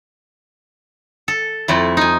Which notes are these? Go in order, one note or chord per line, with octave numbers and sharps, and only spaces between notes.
A4
F2 A3 E4
D#4 G#5